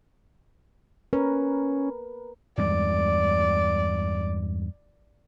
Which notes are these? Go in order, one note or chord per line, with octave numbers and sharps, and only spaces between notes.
C#4 A#4 B4
E2 G2 G#3 D5